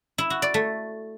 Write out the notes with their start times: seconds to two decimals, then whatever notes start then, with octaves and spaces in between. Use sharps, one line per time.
0.18 E4
0.30 F#4
0.42 D5
0.54 A3